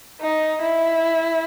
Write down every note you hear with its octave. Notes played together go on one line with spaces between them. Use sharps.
D#4
E4